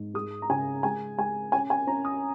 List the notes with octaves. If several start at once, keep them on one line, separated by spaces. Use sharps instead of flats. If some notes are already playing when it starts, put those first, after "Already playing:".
Already playing: G#2
G#3 D#6
A#5
C#3 G#5
G#3 G#5
G#3 G#5
C#4 G#5
G#5
C#4 A#5
D#6